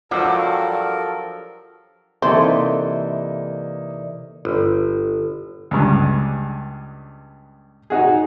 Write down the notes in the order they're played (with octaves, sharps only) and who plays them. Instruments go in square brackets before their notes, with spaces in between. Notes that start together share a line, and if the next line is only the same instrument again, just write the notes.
[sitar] G2 [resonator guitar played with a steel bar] F3 F#3 [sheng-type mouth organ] A4 A#4 [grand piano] F#5 D6 E6
[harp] C3 E3 A4 [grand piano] A#3 D#4 [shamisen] C5 [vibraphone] D5
[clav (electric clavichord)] G1
[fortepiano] C#2 G2
D#4 F#4 G#4